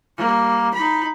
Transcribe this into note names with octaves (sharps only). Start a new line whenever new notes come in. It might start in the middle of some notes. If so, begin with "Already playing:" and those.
G3 A#3
D#4 B5